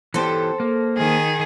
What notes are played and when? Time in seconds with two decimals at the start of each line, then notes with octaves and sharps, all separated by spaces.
0.14 E3 B3 G4 A4 C5
0.60 A#3
0.96 D#3 G#4